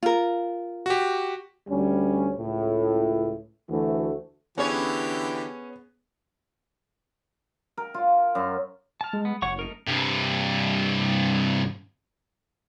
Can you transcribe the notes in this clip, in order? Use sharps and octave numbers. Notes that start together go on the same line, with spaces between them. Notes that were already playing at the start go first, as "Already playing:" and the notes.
F4 A#4
F#4 G4
D2 G3 C#4
C#2 A2
D2 E3 A3 F#4
D3 E3 B3 C#4 G4 G#4 C#5
A#4
F4
F#2
A5 F6
G#3
B3
F#1 C#5 F#5 C#6
A3 D#4 A#4
G2 C3